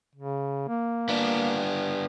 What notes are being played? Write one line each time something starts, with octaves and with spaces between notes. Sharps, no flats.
C#3
A#3
B3 D4